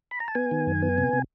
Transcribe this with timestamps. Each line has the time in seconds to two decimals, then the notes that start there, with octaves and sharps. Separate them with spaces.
0.11 B5
0.20 A#5
0.28 A5
0.35 B3 G#5
0.51 D#3
0.67 F#2
0.82 B3
0.98 C3
1.13 C3